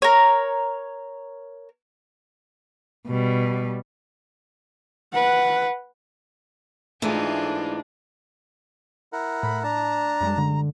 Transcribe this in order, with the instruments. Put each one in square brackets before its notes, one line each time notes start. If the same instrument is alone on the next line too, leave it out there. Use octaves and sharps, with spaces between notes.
[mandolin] A#4 C#5
[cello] B2 G3
[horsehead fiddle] B4 F#5
[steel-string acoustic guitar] G#2 E3 [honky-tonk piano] A3 [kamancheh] D4 [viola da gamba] D#4 F4 G#4
[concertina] E4 A#4 F#5
[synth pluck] A2 [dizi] B5
[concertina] D4 A5 [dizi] A#5
[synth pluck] F#2 G3 G#3
[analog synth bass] D3